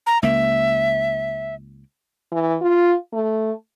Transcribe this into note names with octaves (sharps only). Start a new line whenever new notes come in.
A#5
C#2 A#3 E5
E3
F4
A3